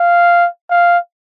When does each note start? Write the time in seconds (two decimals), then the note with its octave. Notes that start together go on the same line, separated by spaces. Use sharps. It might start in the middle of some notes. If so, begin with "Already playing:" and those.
Already playing: F5
0.71 F5